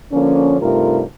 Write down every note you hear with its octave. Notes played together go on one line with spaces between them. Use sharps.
D3 F3 A#3 C#4
G2 C3 A3 D#4 F4 A#4